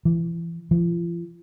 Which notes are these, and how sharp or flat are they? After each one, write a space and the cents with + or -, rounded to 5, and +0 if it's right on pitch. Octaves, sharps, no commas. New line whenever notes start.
E3 +30
F3 -40